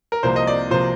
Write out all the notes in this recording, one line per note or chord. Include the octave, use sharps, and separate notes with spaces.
A#4
C2 C3 F3 A#3 C5
D#5
D5
C3 F3 A#3 C5